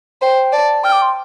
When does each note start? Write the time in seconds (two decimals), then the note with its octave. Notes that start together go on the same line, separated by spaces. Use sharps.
0.22 C5 G5
0.53 D5 A5
0.84 G5 F6
0.92 D6
1.02 C6